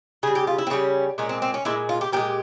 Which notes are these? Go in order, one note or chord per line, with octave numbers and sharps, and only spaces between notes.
C#3 G3 G#4
G4
F4
E4
C4
C#3 G3 C#4
A#2 G#3 C#4
C4
C4
C#4
A#2 G#3 E4
F4
G4
A#2 F3 G#3 G4